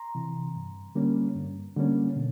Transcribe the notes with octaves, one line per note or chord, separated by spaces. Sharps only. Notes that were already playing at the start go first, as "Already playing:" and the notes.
Already playing: A#5 C6
C3 E3
G2
D3 G3 A#3 C#4
G2
D3 G3 A#3 C#4
B2